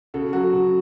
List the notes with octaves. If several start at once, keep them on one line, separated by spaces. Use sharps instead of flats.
C#3 F#4 A4
F#3 F#4 A4
C#3